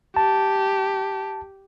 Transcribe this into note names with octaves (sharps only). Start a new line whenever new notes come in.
G4 A5